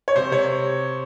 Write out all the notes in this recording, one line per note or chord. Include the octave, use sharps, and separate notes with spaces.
C#5
C3 C5
C3 C#5